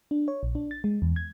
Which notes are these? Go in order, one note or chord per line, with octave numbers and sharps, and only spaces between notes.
D4
C#5
A#1
D4
A6
G#3
E2
G#6